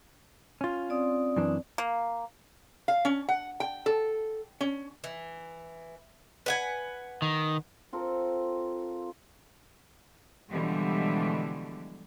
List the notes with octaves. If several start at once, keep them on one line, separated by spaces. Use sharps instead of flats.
C#4 F4
C4 D5 D#6
F#2 E3 D4
A#3
F5
C#4
F#5
G5
A4
C#4
E3
B4 F#5 G#5
D#3
C4 F4 A4 A#4
B2 D3 E3 F3 G3 G#3